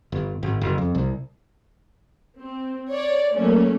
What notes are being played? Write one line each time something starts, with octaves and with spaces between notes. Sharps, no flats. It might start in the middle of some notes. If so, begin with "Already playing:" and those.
G1
G#1
F#1
F2
C2
C4
C#5 D5
F#3 A3 A#3 C#4